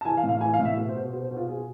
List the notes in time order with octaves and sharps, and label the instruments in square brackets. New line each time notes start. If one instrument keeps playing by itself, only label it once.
[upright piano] A5
E3 G#5
F5
A2
F5
E3 G#5
F5
A2
E5
B2
C5
B2
B2 C5
C5
B2
F4
B2 G#4